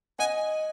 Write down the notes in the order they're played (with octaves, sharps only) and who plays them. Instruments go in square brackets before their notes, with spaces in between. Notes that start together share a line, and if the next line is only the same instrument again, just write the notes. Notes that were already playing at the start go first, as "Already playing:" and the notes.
[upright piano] D#5 F#5 [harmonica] G#5